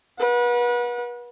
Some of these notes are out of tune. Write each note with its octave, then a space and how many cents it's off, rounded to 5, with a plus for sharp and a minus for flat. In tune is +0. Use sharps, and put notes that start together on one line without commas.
B4 -35 F#5 -30